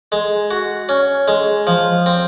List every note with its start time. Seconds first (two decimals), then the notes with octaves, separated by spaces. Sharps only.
0.12 G#3
0.51 F#4
0.89 C#4
1.28 G#3
1.67 F3
2.06 C4